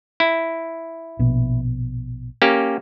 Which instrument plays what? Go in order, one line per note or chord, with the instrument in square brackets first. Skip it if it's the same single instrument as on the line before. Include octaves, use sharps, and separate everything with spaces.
[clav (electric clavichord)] E4
[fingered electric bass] A#1 B2
[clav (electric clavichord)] A#3 C#4 G4